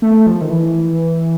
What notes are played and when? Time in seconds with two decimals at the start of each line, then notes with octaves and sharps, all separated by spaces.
0.02 A3
0.26 F3
0.41 D#3
0.50 E3